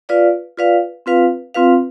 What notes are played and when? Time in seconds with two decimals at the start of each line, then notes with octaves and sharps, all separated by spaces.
0.09 F4 B4 D5 F5
0.57 F4 B4 D5 F5
1.06 C4 F4 B4 F5
1.54 C4 F4 B4 F5